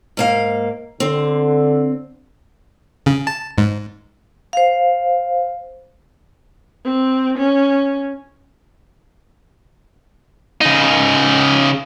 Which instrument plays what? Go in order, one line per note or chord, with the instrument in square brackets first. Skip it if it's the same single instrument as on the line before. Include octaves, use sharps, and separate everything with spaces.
[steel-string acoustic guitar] G#2 A#3 F5
[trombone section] D3 [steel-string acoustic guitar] C4
[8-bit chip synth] C#3
A5
G#2
[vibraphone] C5 F5
[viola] C4
C#4
[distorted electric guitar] C#3 D#4